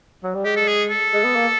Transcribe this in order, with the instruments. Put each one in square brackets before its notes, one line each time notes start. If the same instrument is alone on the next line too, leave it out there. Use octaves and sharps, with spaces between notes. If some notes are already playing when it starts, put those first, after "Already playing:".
[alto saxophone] F#3
G3
[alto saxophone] G#3 [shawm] G4
[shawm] A4
G#4
A4
[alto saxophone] G#3
B3
A#3